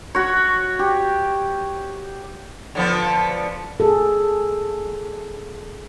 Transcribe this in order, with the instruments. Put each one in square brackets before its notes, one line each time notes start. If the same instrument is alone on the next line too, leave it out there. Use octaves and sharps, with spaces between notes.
[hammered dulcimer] F#4 C#5
G4
[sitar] D3 F3 B3
[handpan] G#4 A4